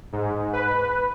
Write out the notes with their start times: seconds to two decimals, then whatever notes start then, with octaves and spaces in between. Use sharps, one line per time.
0.13 G#2
0.53 B4